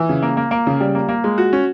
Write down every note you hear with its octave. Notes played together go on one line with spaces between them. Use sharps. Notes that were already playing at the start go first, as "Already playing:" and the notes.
Already playing: E3
C#3
A#3
A#3
A#3
C#3
G3
A#3
A#3
G#3
F#4
C#4